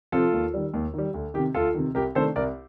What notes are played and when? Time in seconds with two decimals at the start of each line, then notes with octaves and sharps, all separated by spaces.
0.12 C3 F3 C4 F4 A4
0.33 D#2
0.54 D#3 G3
0.74 D#2
0.94 D#3 G3
1.14 D2
1.34 D#3 G4
1.38 C3
1.54 D2 F4 A4
1.75 C3 D#3
1.95 C2 G4 A#4
2.15 C3 D#3 A3 D4 A4 C5
2.36 C2 A#4 D5